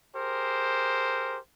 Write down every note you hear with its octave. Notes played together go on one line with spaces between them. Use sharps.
G4 G#4 A#4 C5